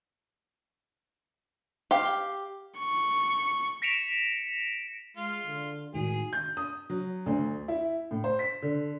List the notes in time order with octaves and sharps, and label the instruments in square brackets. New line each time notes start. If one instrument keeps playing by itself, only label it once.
[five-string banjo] G4 F5
[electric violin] C#6
[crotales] A#6 B6 C#7 D7 E7 F7
[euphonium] G#3 [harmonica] F4
[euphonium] D3
[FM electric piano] A2 D#3 G#3 [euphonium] F#4 [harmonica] G#4
[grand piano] G6
D#6
F#3
D2
E4
A2
C5
B6
D3